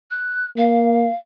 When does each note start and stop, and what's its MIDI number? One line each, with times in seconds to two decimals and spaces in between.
0.10 0.45 90
0.57 1.09 58
0.57 1.14 77